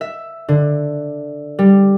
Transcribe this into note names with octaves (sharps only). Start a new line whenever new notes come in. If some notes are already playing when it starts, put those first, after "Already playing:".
E5
D3
G3